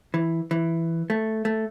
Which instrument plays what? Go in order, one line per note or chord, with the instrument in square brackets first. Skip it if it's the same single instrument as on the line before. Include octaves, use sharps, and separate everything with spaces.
[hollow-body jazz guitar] E3
E3
A3
A3